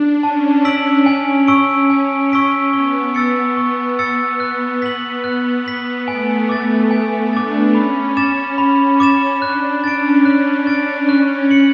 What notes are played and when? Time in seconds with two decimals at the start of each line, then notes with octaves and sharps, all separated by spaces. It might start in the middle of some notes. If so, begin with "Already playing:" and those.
Already playing: D4
0.23 C#4 A5
0.65 D4 E6 B6 D7 F#7
1.06 C#4 G#5
1.48 C#6 E6 B6 D7
1.90 G#5
2.32 C#6 E6 B6 D7
2.73 B3 C#6
3.15 E6 A6 C#7
3.57 C#6
3.99 E6 A6 C#7
4.40 F#6
4.82 B6 F#7
5.24 F#6
5.66 B6 F#7
6.07 A3 G#5
6.49 B3 D6 A6
6.91 G#5
7.33 D4 D6 A6
7.75 C#4 B5
8.17 D6 A6 E7
8.58 B5
9.00 D6 A6 E7
9.42 D4 F#6
9.83 C#4 A6 D7
10.25 C#4 F#6
10.67 D4 A6 D7
11.09 C#4 F#6
11.51 C#7 F#7